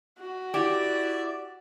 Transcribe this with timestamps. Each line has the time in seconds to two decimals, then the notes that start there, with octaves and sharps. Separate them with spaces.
0.19 F#4
0.54 E4 G4 D5